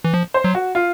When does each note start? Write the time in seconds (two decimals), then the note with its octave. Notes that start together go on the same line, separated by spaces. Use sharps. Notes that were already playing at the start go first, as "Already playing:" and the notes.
0.04 E3
0.14 F3
0.34 C5
0.44 F#3
0.55 F#4
0.75 F4